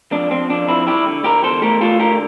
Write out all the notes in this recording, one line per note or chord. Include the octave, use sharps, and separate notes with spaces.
F2 D4
F2 C4
F2 D4
F2 C4 E4
G3 E4 G4
D3
D3 G4 A#4
E2 A4 C5
A3 G4 A#4
A3 F4 A4
D3 G4 A#4